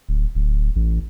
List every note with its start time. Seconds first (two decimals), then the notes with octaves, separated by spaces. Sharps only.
0.09 D1
0.35 D1
0.76 A1